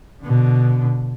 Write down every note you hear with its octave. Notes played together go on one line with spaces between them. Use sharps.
B2 D3